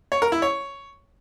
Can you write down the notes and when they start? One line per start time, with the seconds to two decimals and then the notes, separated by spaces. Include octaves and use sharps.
0.12 C#5
0.22 A#4
0.32 E4
0.42 C#5